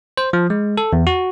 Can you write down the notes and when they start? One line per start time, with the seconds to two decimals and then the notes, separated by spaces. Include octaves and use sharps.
0.17 C5
0.33 F3
0.50 G#3
0.77 A4
0.93 E2
1.07 F#4